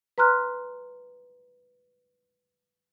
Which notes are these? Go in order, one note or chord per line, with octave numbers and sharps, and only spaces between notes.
B4 A#5 C6 F6 F#6